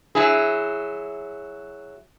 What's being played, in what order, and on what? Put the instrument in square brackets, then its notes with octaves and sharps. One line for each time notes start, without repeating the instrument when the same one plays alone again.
[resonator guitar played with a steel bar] F#3 E4 G#4